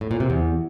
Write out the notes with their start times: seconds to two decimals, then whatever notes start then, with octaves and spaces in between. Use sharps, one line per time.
0.01 A2
0.11 A#2
0.20 C3
0.30 E2